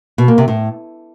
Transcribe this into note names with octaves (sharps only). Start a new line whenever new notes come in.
B2
A#3
C3
A2